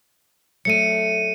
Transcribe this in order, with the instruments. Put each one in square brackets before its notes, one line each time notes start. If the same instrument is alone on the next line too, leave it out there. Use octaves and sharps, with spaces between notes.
[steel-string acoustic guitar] F#3 A3 D4 [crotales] C#7 D#7